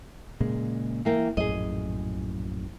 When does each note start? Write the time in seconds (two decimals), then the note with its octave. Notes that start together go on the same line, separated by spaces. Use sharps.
0.40 A#2 C#3 G#3
1.05 E3 A#3 G5
1.37 A#1 F#2 A2 G#4 D#5